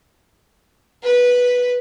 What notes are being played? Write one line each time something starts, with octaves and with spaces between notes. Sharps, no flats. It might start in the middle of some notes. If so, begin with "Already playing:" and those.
B4